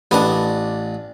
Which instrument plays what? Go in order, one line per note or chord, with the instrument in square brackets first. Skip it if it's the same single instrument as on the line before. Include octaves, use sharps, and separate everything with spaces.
[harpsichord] A1 D#5 D6 [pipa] B3 D4